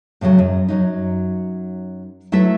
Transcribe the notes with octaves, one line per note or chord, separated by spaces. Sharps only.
A2 C#3 F3 F#3 A3
F#2
F#2 F#3 D#4
F#3 A3 E4 B4 E5